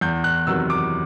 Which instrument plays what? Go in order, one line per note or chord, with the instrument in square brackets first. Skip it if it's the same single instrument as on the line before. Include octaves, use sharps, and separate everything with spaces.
[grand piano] E2 G6
F#6
C3 D#3 F#3 B3 E6
D6